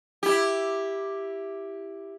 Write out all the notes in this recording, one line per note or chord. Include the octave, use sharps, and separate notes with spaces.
E4 G4